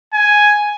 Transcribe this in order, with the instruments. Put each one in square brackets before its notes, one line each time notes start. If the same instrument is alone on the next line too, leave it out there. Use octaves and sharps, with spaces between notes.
[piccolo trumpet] G#5